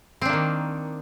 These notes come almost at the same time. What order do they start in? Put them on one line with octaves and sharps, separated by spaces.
C4 D4 A#3 D#3